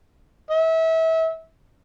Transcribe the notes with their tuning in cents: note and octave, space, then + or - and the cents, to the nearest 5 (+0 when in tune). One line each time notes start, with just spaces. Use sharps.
E5 -30